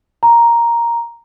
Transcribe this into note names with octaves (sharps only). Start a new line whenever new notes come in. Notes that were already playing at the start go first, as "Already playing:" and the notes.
A#5